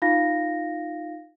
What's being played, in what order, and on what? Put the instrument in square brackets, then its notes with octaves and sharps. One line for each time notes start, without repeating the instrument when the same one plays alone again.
[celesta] D#4 F4 F5 A#6